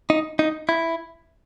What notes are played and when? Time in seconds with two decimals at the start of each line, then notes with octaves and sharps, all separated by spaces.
0.10 D#4
0.39 D#4
0.69 E4